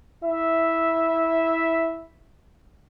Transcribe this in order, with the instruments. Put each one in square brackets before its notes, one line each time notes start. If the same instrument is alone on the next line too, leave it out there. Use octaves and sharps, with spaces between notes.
[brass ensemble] E4 E5